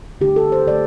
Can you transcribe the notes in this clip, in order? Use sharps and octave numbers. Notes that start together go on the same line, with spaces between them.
D3 A3 G4
A4
C5
D3 A3 D5